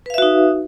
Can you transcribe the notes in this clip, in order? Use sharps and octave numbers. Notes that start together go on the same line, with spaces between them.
D#4 F#4 B4 E5 F5